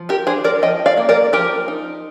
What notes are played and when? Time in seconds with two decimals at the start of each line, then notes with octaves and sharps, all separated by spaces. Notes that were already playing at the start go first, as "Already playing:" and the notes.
Already playing: F3
0.09 G4 A#4
0.27 D4 G#4 C5
0.44 A#4 D5
0.62 F3 D#5 G5
0.86 D5 F5
0.97 A#3
1.09 A#4 D5
1.33 F3 G4 A#4
1.68 D#4